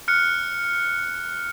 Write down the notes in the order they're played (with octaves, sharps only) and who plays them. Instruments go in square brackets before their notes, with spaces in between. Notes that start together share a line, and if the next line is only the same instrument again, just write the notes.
[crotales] F6 F#6 C#7